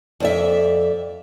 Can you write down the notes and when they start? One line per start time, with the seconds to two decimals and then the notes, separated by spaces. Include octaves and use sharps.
0.20 F2 D5 E5